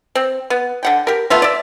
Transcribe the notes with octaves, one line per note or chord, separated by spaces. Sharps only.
C4
B3
D3 F#5 G5
G4 A#4
A3 B3 F4 E5
D5 E5